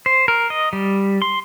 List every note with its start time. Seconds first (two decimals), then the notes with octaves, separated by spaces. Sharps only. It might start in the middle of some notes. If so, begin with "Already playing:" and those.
0.06 C5
0.28 A#4
0.50 D#5
0.73 G3
1.22 C6